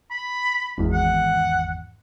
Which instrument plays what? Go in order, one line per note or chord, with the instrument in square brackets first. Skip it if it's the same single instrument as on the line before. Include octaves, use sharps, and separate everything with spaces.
[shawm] B5
[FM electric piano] G#1 E2
[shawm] F#5